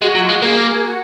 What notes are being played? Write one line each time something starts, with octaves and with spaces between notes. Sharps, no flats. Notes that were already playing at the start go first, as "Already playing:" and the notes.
G#3 F#4
F#3 F4
G#3 F#4
A#3 G#4
A#4
G#4
F#4